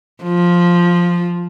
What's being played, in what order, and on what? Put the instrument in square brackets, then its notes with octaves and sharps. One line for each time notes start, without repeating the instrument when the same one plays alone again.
[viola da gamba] F3